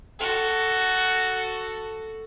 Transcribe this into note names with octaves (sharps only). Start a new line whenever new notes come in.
F#4 A4